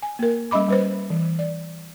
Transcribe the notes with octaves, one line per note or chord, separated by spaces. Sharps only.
G#5
A#3 A#4
G3 C#4 D#5 B5 D6
G3 B4 C5
E3
D5